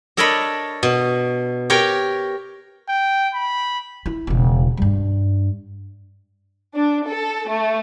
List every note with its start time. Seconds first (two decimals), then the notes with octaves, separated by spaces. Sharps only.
0.17 D4 A4 A#4 C#5 D#5 B5
0.83 B2
1.70 G4 A#4 C#5 G5
2.89 G5
3.34 B5
4.06 E4
4.27 E1 C#3
4.77 G2 G3
6.75 D4
7.07 A4
7.48 A3